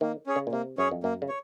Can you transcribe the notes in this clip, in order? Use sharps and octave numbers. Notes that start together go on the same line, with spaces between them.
D#3 A#3
C#4 G#4 C#5
C#3
A#2
C3 A#3
F#2 C#4 G#4 C#5
F2
F#2 A#3
C#3
C#5